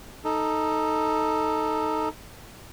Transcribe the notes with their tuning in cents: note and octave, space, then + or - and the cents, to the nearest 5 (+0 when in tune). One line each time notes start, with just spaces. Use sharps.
D#4 +5 A4 +0